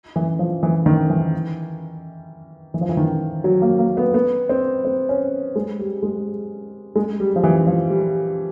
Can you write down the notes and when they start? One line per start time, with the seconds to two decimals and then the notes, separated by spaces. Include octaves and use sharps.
0.16 E3
0.39 F3
0.63 E3
0.86 D#3
1.10 E3
2.74 E3
2.81 F3
2.89 E3
2.97 D#3
3.44 F#3
3.62 A#3
3.79 A#3
3.97 B3
4.14 B3
4.49 C4
4.85 C4
5.09 C#4
5.56 G#3
5.79 G3
6.03 G#3
6.96 G#3
7.20 G3
7.36 F3
7.44 E3
7.67 F3
7.90 G3